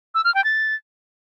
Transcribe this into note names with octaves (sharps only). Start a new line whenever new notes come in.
E6
F6
G5
A6